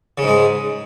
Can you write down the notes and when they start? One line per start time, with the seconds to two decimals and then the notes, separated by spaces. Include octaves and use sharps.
0.18 C#3
0.23 G#2
0.27 G#3